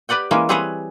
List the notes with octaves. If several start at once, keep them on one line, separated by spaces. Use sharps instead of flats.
G4 B4 D5 F#5 G5
E3 G#3 A#3 C#4
G3 C4 G#4 B4 C#5 F#5